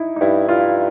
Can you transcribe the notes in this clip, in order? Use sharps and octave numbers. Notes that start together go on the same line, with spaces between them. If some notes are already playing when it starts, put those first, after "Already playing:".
Already playing: D#4 E4
D#4
G2 E4
G2 F4